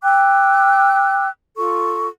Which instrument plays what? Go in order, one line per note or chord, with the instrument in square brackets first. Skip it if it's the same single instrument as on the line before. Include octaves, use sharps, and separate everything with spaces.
[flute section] G5 D6 E6 F#6
F4 A4 C#6